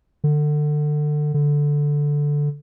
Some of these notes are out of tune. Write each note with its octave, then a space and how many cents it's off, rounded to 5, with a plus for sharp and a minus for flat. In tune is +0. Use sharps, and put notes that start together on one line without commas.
D3 +25
D3 -5